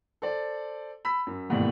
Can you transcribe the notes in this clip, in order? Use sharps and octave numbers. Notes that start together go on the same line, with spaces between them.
A4 C5 D5
B5 E6 B6
F#2
D#2 G#2 B2 E3 G3 A3